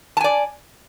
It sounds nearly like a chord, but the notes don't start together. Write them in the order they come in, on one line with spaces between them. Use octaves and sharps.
A5 G#5 D5